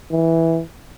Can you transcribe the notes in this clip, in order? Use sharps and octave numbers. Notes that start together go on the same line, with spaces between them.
E3